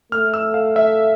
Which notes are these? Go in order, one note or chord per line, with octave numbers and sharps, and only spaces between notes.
A3 F6
E6
F5
E5